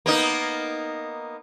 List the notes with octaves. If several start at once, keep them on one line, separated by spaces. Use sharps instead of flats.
A#3 B3 D#4